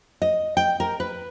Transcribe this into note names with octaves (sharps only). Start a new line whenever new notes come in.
D#5
G5
A#4
B4